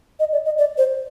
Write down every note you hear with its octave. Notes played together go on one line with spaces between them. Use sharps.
D#5
D5
D#5
D5
C5